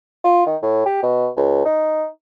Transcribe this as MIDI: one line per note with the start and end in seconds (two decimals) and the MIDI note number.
0.24 0.45 65
0.46 0.56 51
0.62 0.83 45
0.86 1.02 67
1.03 1.28 47
1.37 1.62 37
1.65 2.05 63